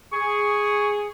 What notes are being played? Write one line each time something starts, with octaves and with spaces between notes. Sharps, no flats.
G#4 C#6